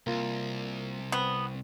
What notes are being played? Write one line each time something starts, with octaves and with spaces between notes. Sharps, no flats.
C2 A#3 F4
B3 C4